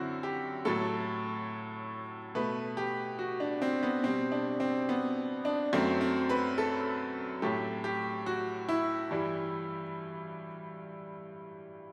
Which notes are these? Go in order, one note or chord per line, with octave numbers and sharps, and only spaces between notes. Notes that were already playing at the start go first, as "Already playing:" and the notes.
Already playing: F#2 D3 C4 E4 F#4
G4
A2 F#3 A3 A4
B2 A3 B4
G4
F#4
D4
C4
B3
B2 G3 C4
D4
C4
B3
D4
F#2 F#3 A3 C4
C4
B4
A4
A2 F#3 A3 G4
G4
F#4
E4
G2 E3 G3